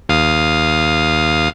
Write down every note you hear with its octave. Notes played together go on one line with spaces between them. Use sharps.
D#2 F5 D#6